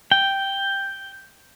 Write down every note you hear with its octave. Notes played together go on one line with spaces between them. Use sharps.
G5